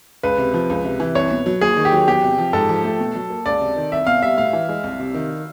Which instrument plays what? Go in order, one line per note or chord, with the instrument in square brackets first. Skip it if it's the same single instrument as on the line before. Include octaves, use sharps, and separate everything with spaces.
[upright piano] C#2 [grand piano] B4
[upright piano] C3
F3
C#2
C3
E3
[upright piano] C2 [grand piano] C#5
[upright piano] B2
F#3
[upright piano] D#2 [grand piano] G#4
[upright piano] D#3
[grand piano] G4
[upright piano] F#3
[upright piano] E2 [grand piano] G4
[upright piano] C3
F3
[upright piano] G#2 [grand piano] A4
[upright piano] F3
A3
B2
F#3
A#3
[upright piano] C#2 [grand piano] D5
[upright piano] C3
D#3
[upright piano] C2 [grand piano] E5
[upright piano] B2 [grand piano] F5
[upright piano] G3 [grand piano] E5
[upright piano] A2 [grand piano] F5
[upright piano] E3
G#3
C2
C3
D#3